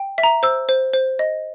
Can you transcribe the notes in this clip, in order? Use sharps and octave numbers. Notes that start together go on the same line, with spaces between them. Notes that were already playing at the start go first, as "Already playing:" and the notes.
Already playing: G5
E5
A#5
C5 E6
C5
C5
D#5